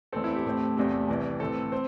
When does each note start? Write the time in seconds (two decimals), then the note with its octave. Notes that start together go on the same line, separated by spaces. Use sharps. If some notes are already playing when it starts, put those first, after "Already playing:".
0.12 E2 E3 A3 C4 A4
0.24 E4
0.35 G4
0.45 A2 A3 C4
0.77 E2 C3 A3 G4
1.08 C2 C3 E3
1.40 A2 E3 A3 C4 A4
1.72 C4 C5